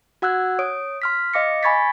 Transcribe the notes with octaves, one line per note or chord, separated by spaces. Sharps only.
F#4 F#5 E6 F#6 G#6
C#5 D#6 D7
C6 F6 B6
D#5 F5 D6 A#6 C#7
G#5 B5 C#6 G#6 A6 B6